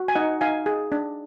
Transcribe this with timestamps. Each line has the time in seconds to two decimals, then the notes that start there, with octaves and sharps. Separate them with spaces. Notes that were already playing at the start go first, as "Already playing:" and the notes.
Already playing: F#4
0.08 G#5
0.15 D#4 D#5 F#5
0.41 D#4 F5 G#5
0.66 G#4
0.92 D4